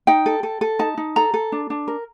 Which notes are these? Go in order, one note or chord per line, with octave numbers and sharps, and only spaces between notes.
D#4 G5
A4
A4
A4
D#4 A5
D#4
A4 A#5
A4
D4
D4
A#4